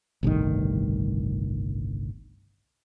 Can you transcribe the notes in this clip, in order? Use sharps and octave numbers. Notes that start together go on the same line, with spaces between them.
G1 C2 A2 D#3